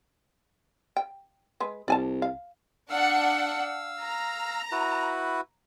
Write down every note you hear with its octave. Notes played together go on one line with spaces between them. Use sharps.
G5
G#3 B4
C2 D5 G#5 A5
F5
D4 F5 F#5 E6
A#5
E4 F#4 B4